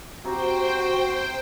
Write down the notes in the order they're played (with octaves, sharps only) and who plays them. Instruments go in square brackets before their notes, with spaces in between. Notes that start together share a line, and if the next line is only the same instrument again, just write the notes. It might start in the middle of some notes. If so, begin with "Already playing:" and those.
[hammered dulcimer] C3 A#5 [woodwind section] F#4 [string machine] C5 G5